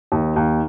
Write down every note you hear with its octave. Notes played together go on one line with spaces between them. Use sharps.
D#2
D#2